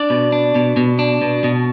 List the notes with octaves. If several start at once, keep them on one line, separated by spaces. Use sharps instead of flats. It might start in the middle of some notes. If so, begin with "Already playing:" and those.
Already playing: D4 D5
B2
D4
B2
B2
D4
B2
B2